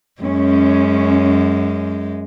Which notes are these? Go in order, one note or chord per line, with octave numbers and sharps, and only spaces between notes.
F#2 G#3 C#4